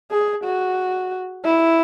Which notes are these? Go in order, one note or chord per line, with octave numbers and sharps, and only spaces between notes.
G#4
F#4
E4